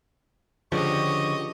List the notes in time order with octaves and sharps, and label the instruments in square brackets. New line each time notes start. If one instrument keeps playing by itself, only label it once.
[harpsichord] C#2 [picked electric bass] D3 F3 [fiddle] G4 D#5 [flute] C#6